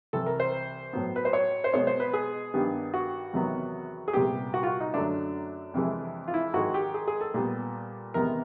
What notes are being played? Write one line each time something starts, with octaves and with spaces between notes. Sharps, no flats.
C2 C3 E3 A4
A#4
C5
A2 F#3 B3
B4
C5
C#5
C5
B2 G#3 B3 C#5
C5
B4
G#4
G2 D#3 G3 B3
F#4
E2 C3 D#3 F#3 B3
G#4
C2 A#2 G3 B3 G4
F#4
F4
F#4
D#4
F#2 D3 F#3 A3 D4
F2 C3 E3 G#3
F4
E4
G#2 D#3 G#3 F#4
G4
G#4
G#4
A4
A#2 G3 B3
E2 C3 D#3 G#3 B3 A#4